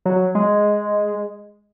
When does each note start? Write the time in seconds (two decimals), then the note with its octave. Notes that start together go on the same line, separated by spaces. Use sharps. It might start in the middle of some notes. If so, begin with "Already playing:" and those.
0.06 F#3
0.35 G#3